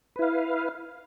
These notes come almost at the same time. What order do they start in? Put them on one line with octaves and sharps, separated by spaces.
B4 E4 F5